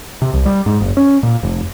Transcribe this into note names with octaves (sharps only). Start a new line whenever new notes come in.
C3
C2
G3
G#2
F#1
C#4
A#2
F1